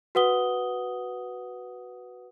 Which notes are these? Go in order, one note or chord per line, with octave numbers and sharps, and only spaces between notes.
F#4 B4 F#5 D#6 G7